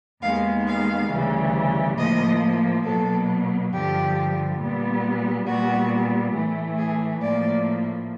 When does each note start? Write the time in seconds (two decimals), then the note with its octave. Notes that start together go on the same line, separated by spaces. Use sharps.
0.22 D#2 D#3 G#3 B3 F5
0.66 F5
1.09 D2 C#3 E3 G3
1.97 A2 F3 A#3 D#5
2.84 B2 F#3 A#3 A4
3.72 G2 D3 F3 G4
4.59 A#2 G3 B3
5.46 A#2 G3 B3 F#4
6.34 A2 E3 A3
6.77 G#4
7.21 A2 F3 A#3 D5